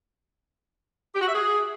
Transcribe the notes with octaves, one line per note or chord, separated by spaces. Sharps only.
G4
F#4
E5
G#4